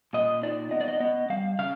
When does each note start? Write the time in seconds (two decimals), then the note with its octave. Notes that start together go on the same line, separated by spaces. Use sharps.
0.13 A#2 D#5
0.42 D#4 D5
0.71 B3 D#5
0.81 D5
0.88 D#5
1.00 B3 D#5
1.29 G3 F5
1.59 C#3 F5